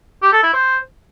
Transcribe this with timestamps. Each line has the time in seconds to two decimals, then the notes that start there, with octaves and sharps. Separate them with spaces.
0.22 G4
0.33 A4
0.43 E4
0.54 C5